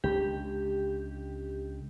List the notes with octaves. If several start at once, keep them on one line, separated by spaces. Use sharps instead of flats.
C#2 D3 G4